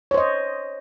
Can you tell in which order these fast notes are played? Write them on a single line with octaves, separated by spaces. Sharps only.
C#5 C5 D#5